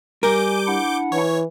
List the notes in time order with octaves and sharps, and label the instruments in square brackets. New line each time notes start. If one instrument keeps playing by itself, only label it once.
[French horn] G3 [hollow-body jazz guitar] A#4 [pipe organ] G#5 [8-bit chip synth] D6 G6
[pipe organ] D4 E4 F#5
[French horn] E3 [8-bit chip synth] C#5